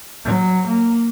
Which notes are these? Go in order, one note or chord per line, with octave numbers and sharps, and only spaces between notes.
F#3
A#3